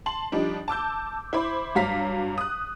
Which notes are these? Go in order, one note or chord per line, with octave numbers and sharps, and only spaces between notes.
A5 C6 F#7
F3 G3 D4 D#4
A5 D6 E6 G6
E4 C5 B5 D6
G2 F#3 F5 A#5 B6
D#6 F#6